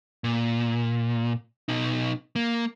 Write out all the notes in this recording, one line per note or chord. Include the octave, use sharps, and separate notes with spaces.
A#2
B2 D#4
A#3